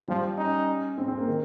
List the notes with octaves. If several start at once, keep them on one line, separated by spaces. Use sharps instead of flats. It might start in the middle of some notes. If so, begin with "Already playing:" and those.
F3 G3
C#4 D#4
C4
C4
A#3
D#3